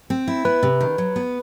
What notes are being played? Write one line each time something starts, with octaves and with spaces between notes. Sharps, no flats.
C4
E4
B3 B4
C3
D#3
F#3
B3